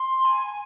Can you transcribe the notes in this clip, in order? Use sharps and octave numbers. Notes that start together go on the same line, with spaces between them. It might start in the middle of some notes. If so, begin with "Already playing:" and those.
Already playing: C6
G#5